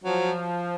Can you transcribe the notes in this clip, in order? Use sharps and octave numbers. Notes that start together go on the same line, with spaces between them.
F3 F#3